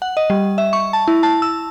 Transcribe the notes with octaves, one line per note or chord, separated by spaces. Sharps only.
F#5
D#5
G3
E5
C#6
A5
E4
A5
E6